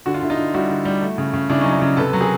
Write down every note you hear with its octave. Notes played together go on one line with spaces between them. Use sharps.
D3 F#4
F4
D3 E4
D#4 F4
D3
G3 E4 F#4
D3
G3
A3
C#3
C#3
C#3 D4 E4
C#4 D#4
F#3
D4 E4
C#3
C3 A4 B4
F#3 B4
G#4 A#4